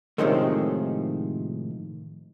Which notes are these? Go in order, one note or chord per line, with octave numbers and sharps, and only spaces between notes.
A2 C3 D#3 F3 G#3 A3